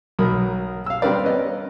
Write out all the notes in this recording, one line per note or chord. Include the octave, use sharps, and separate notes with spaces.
B1 F#3 A#4 B5 D#6
F5 E6
G3 C4 D4 A#4 B4 D5
B3 C#4 B4 D#5